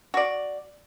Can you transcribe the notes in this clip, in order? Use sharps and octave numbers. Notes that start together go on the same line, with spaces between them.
F#4 D5